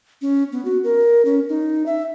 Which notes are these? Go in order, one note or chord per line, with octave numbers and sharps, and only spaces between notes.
C#4
B3
F#4
A#4
C#4
D#4
E5